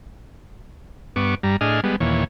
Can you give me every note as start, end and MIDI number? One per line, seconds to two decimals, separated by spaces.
1.16 1.35 43
1.16 1.35 59
1.16 1.35 85
1.16 1.35 86
1.43 1.56 43
1.43 1.56 55
1.43 1.56 82
1.61 1.81 45
1.61 1.81 62
1.61 1.81 68
1.61 1.81 75
1.61 1.81 89
1.84 1.96 55
1.84 1.96 56
1.84 1.96 59
2.00 2.24 39
2.00 2.24 46
2.00 2.24 52
2.00 2.24 73